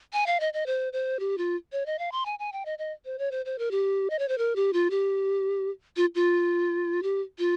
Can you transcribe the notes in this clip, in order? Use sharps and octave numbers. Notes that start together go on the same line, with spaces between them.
G#5
F5
D#5
D#5
C5
C5
G4
F4
C#5
D#5
F5
C6
G#5
G#5
G5
D#5
D#5
C5
C#5
C5
C5
A#4
G4
D#5
C#5
C5
A#4
G4
F4
G4
F4
F4
G4
F4